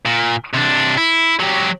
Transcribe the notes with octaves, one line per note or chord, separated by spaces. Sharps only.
A#2
C3 D4
E4
F#3 G4